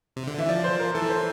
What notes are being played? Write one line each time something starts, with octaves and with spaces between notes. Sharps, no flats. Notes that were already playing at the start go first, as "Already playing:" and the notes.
C3
D3
E3 E5
F3 D5
C5
A#4
E3 A4
C5